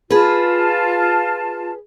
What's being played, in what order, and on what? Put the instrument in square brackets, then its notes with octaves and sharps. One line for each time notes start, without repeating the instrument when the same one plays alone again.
[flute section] F4 A5 [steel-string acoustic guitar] G#4 B4